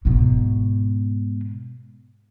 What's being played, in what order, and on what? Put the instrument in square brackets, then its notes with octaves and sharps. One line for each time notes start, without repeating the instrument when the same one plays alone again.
[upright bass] G#2 B2